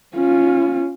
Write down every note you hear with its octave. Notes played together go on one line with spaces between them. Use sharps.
C#4 F4